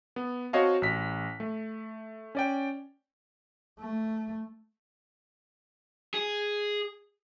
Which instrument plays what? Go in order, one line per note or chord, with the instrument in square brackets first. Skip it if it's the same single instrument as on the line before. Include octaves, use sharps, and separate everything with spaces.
[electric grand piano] B3
C4 F#4 C#5 D#5 F5 A5
A1 B6
A3
C#4 D5 G5
[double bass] A3
[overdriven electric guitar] G#4